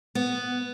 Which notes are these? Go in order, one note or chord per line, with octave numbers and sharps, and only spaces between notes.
B3